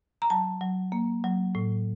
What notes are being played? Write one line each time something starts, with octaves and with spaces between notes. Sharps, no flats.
A#5
F#3 A5
F#3
A#3
F#3
A2